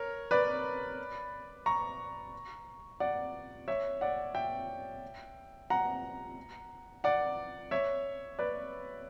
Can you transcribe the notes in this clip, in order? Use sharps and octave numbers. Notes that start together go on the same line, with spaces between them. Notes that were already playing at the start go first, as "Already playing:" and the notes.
Already playing: A#4 C#5
B4 D5
A#5 C#6
D5 F#5
C#5 E5
D5 F#5
E5 G5
F#5 A#5
D5 F#5
C#5 E5
B4 D5